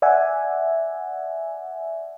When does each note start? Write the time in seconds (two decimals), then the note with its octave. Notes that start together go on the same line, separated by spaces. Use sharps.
0.02 D5 E5 F#5 G#5